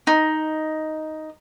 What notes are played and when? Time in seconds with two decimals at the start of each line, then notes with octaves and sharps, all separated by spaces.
0.07 D#4